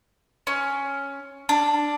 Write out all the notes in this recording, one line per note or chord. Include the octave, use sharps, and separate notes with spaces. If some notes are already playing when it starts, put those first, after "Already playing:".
C#4
D4